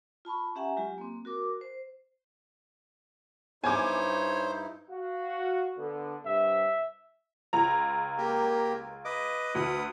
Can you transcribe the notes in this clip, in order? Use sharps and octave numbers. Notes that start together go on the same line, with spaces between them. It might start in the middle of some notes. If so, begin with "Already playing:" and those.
F4 A5 B5 C#6
C#4 G4 E5 F#5 G#5 A#5
F#3 G#3 F4 G4
A#3 C4
F#4 A#4 D6
C5
G2 D#4 E4 C5 C#5 G#5 D6
F#4 F5
D3 B3 A4
G2 C3 E5
C#2 A#5
A#3 G4 A#4
B4 D#5 D6
D2 B4 D#6